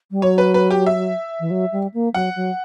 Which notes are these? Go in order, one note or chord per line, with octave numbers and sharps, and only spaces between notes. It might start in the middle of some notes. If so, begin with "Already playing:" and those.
G3
F#3 C#5
B4
B4
G4
E5
E3
F#3
G3
A#3
F#3 F#5
F#3